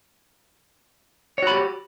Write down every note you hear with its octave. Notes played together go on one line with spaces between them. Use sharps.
F#4 G4 C#5 B5